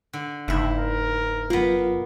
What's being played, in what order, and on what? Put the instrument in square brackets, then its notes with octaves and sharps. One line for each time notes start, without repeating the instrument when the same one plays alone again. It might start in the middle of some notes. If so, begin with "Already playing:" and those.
[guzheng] D3
[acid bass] F#1 [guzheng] G#2 E4 [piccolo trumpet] E5
[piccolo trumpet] A#4
[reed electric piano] F#2 F4 [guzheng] A#3 B3